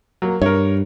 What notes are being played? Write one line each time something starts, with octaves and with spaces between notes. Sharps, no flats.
F#3 A#3
G2 A#4 C#5